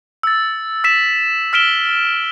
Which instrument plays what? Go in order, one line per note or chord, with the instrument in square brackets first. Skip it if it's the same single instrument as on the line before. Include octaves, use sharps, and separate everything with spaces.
[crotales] E6 A6
E6 B6 E7
E6 F6 B6 D7 E7 G7